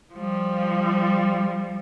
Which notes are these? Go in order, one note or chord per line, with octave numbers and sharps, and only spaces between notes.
F3 G3